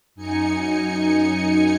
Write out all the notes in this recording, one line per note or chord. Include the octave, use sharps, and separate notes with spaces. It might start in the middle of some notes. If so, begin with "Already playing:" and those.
F#2 D#4 G#5 C#7